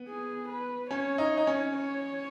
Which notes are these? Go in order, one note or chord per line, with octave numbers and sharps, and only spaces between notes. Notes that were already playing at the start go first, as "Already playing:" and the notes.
Already playing: B3
G#4
B4
C#4 C#5
D#4
D#4
C#4
C#5